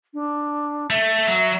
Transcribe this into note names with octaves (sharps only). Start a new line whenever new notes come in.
D4
A3 E5
F#3